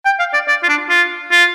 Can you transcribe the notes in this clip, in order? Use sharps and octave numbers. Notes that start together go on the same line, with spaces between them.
G5
F5
D5
D5
F4
D4
F4
F4